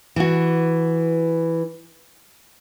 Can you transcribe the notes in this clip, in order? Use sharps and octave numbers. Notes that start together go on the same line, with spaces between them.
E3 F#4